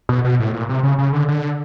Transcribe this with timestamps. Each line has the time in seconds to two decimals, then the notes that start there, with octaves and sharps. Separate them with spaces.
0.09 B2
0.24 B2
0.40 A2
0.54 A#2
0.69 C3
0.83 C#3
0.99 C#3
1.13 D3
1.29 D3